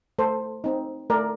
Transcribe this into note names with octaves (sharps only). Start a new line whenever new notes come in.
A3 A4 C5
C4 D#4
A3 A#4 D5